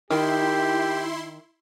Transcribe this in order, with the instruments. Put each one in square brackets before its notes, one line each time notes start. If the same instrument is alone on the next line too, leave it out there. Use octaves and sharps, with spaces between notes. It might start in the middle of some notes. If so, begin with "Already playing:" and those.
[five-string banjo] D#3 [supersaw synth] E4 C6 [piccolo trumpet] G4